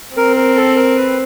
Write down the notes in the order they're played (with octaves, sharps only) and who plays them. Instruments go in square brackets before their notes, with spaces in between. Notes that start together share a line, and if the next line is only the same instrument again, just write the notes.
[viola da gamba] C4 [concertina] A#4
[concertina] A#4
A4
A#4
B4